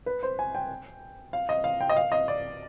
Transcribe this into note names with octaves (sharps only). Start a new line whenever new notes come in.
B4
C5
G#5
G5
F5
D#5
F5
G5
D#5
F5
D#5
D5